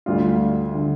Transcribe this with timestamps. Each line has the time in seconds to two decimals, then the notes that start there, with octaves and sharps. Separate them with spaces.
0.06 D2 D3 G3 F4
0.74 D3 G3